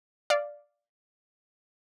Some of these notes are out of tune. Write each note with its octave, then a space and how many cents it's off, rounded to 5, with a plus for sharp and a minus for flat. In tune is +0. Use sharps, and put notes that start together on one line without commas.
D5 +0 F5 +0